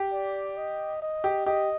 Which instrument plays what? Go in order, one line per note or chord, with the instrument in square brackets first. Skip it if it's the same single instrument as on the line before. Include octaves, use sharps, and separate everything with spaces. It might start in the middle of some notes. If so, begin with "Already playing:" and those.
Already playing: [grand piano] G4
[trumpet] D5
D#5
D#5
[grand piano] G4
[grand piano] G4 [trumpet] D#5